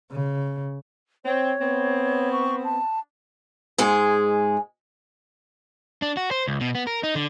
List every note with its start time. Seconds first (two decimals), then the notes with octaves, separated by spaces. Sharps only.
0.12 C#3
1.25 C4 C#5
1.61 B3 C4
2.32 C#6
2.64 A5
3.78 G#2 G#3 G#4
6.02 D4
6.17 F#4
6.31 C5
6.47 C#2
6.61 B2
6.75 B3
6.87 A#4
7.03 D#4
7.15 D3